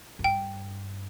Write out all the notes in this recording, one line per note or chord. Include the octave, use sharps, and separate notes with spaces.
F#2
G2 G5